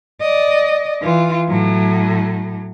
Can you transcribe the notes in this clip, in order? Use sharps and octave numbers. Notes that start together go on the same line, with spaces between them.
D5 D#5
E3 F4
A2 F#3